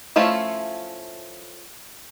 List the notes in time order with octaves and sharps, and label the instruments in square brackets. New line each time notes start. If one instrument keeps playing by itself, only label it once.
[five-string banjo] F3 A3 C#4 E4 F4